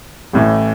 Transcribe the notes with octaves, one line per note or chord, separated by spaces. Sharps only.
A1 A2 E3